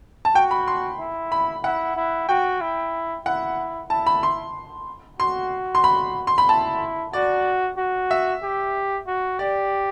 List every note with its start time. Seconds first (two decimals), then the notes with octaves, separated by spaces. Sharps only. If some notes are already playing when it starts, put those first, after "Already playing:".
0.25 A5
0.35 F#4 G5
0.51 B5
0.68 C6
1.00 E4
1.32 B5
1.64 E4 F#5
1.96 E4
2.29 F#4 G5
2.61 E4
3.26 E4 F#5
3.90 E4 A5
4.06 B5
4.23 C6
5.19 F#4 C6
5.75 C6
5.84 B5
6.27 C6
6.38 B5
6.49 E4 A5
7.13 F#4 D5
7.78 F#4
8.11 E5
8.42 G4
9.07 F#4
9.39 G4 D5